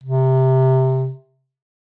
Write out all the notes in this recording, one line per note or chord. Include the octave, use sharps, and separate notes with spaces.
C3